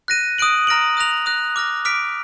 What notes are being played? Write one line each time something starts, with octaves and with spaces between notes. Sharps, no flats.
F#6 A#6 D#7
D#6 F#6 D7 F#7
A#5 F6 A#6 D7 F#7
D#6 F#6 A#6 F7
D#6 F#6 A#6
D6 F6 A#6
D6 F6 B6 D7